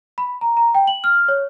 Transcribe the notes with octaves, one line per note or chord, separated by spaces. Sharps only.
B5
A#5
A#5
G5
F#7
F6
C#5